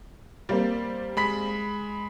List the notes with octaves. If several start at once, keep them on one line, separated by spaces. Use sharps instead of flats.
G3 A#3 C4
G#3 B5 B6